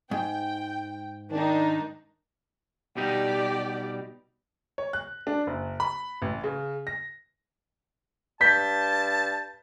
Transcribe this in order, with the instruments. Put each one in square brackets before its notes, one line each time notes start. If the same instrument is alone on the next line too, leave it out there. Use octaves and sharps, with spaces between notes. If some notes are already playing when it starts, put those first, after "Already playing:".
[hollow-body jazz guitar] G#2 [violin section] G5
[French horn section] D#3 [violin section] D4 D#4
[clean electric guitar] B2 G3 D#4 [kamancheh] G4 D5
[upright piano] C#5
F#6
D4
F#1
B5
A1
C#3
A#6
[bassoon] G2 [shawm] A5 [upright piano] G6 B6